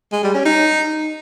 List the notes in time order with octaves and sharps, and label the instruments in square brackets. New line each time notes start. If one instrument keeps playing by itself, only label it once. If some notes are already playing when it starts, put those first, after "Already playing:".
[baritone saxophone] G#3
G3
C#4
D#4